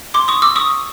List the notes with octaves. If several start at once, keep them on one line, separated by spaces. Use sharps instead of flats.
C6 D6
C#6 D#6
D6 E6
C#6 D#6